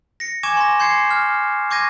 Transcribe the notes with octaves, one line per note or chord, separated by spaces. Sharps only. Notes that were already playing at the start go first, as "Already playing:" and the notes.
A#6 C#7
G#5 C#6 D6 G#6 E7
C6 A#6
C6 G6 G#6 C7 C#7
F6
C#6 D6 G6 G#6 A#6 D#7